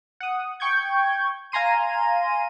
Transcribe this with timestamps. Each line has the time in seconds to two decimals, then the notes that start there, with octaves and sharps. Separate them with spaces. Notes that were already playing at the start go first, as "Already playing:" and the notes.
0.20 F#5 D#6
0.60 G5 C#6 G6 G#6
1.52 F5 G#5 A#5 C6 D#7